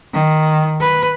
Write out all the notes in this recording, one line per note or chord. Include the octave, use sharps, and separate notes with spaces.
D#3
B4